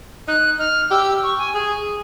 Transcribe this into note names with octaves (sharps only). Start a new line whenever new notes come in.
D#4 F#6
D#4 F6
G4 E6
C#6
G#5
G#4